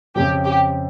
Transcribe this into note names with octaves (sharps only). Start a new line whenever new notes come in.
F2 C#3 F3 G4
G4